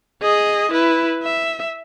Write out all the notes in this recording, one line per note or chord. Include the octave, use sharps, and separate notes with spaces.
G#4 D#5
E4 B4
E5